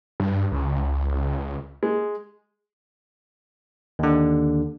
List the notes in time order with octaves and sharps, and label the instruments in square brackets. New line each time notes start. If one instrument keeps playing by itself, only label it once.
[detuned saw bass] G2
C#2
[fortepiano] G#3
[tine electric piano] D#2 D3